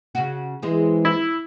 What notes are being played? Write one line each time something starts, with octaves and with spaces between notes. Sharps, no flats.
C#3 F#4
E3 G#3 C4 G#4
E4